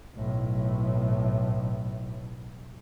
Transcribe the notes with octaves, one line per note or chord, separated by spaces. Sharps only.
B1 A2